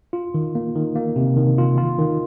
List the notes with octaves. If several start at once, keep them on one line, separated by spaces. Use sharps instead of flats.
F4
D#3
A#3
D#3
A#3
C3
D#3
F4
F4
D#3